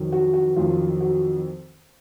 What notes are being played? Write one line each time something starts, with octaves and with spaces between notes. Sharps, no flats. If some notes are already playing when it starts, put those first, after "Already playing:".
Already playing: F2 D#3 F#3
F#4
F#4
F2 D#3 F#3 F4
F#4